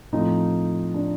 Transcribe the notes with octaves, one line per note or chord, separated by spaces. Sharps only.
A2 F3 C4 D#4
D4